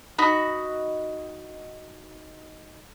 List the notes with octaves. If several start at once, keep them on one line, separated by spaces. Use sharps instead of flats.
D#4 F#4 B5